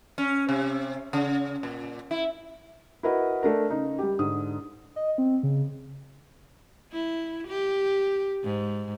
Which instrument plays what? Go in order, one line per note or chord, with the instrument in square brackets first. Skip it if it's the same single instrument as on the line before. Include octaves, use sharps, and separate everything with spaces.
[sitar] C#4
C3
C#3
A#2
E4
[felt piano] E4 F#4 A#4 B4 D#5 F#5
A3 D4 A#4
C#3 D#4
G3 G4
G#2 D3 D#6
[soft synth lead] D#5
C4
C#3
[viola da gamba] E4
G4
G#2